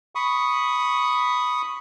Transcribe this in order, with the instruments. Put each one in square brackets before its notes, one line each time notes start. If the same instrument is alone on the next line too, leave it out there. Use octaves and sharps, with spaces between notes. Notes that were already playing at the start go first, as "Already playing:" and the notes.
[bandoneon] B5 C#6 D#6